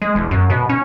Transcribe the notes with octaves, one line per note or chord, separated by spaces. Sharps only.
G#3
E1
F#2
B2
C#4